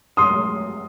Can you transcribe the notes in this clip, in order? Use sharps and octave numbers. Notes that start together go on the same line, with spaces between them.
C6 D#6